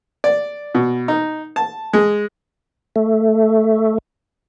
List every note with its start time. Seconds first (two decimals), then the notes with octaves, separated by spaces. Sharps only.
0.24 D5
0.75 B2
1.08 D#4
1.56 A5
1.93 G#3
2.96 A3